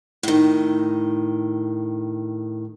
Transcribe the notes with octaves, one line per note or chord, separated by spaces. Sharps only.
A2 D#3